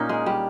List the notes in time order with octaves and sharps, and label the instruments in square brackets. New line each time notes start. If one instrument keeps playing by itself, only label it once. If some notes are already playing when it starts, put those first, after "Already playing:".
Already playing: [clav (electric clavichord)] A#2 A#3 C#4 [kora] D#4
[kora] G#3
G3